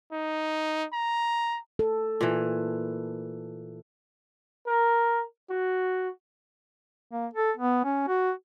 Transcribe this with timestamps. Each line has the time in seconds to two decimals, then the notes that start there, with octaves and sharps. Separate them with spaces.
0.12 D#4
0.93 A#5
1.79 A4
2.21 A#2 E3
4.67 A#4
5.50 F#4
7.11 A#3
7.34 A4
7.57 B3
7.85 C#4
8.08 F#4